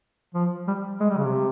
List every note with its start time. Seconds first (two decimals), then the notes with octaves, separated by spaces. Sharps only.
0.35 F3
0.68 G3
1.00 G#3
1.10 G3
1.17 C#3
1.25 C3